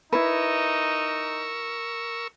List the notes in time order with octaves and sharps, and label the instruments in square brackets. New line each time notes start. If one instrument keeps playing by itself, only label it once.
[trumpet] D#4 [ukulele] E4 B4 [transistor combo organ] A#4 C#6 E6